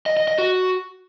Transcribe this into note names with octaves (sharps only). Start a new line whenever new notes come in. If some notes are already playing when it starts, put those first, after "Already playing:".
D#5
D#5
D#5
F#4